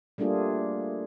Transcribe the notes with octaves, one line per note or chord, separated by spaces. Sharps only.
G3 A3 A#3 D4 F4 G#4